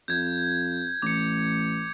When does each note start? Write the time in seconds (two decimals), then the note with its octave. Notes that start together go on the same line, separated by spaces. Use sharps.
0.08 F2 G6 G#6
1.02 A1 D6 C#7